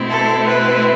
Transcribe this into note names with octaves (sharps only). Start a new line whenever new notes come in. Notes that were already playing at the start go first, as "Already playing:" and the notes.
Already playing: B2 A3 C4 E4
A4
B4